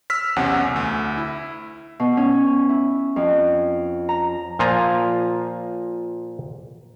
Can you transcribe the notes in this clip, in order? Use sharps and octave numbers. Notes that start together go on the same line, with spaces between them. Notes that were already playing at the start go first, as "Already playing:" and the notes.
E6 F6 B6
B1 E2 C3 C#4 F#5
D2
E4
B2
C#4
E4
F2
A#5
A#2 F3 F4 G#5 A#5